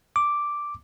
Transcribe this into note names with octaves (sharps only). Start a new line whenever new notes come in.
D6